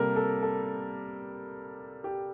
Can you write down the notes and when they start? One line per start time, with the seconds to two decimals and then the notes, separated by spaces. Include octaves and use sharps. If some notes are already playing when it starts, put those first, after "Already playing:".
Already playing: C3 G3 A#3 A4 A#4
0.16 A4
0.43 A4
2.04 G4